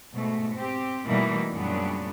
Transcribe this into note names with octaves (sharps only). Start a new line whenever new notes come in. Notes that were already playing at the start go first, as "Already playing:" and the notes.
G#2 B2 A3
C4 G4
B2 E3 G3 A3 A#3 D#4
F#2 A#2 C#3 G3 B3 D4